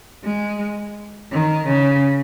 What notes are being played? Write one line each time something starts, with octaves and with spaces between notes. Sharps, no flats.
G#3
D#3
C#3